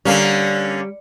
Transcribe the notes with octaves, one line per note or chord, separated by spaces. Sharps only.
D3 G3 A#3 C#4